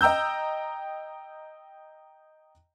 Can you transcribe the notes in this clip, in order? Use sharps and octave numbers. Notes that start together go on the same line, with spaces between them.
D#5 G5 A#5 E6 G6